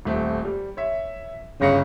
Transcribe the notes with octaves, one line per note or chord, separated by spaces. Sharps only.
D#1 A3 C4
G3
C#5 E5
G1 C#3 A#6 C#7